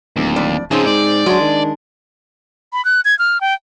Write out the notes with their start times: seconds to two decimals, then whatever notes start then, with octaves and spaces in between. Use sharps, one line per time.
0.16 D1 D#2
0.36 F2 D5
0.71 G#2 C#3 F3 C4 D#4 G#4
0.86 G#2 D5
1.26 F#3 G#3 D4
1.41 D#3
2.73 B5
2.85 F#6
3.05 G#6
3.19 F6
3.41 G5